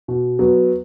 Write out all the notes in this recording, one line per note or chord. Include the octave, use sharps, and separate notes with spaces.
B2
F#3 B3